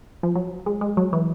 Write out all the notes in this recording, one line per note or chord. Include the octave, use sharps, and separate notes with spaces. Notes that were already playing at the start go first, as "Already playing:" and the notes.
F3
F#3
G#3
G#3
F#3
E3